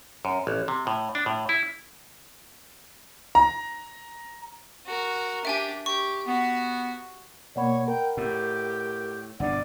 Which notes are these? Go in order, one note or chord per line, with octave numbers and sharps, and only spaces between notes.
F#2
A1
C3
A2
D4
A2
E4
A#5
F#4 A#4
D4 G4 E5 G5 G#5
G4 C#6
B3 F#4
B2 A#3 C#5 D5 F#5 B5
A#4 G5
A2 G4
G1 B2 D4 D5 F#5